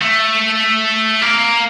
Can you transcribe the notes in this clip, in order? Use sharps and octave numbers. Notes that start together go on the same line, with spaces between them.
A3
A#3